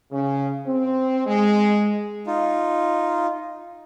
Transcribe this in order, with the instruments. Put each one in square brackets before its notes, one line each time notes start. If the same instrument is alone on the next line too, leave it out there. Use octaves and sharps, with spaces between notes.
[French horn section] C#3
C4
G#3
[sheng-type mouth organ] D#4 F4